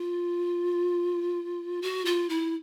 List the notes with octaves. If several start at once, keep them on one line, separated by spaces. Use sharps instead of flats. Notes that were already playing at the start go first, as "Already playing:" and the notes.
Already playing: F4
F#4
F4
E4